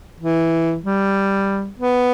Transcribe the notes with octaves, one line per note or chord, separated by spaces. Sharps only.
E3
G3
B3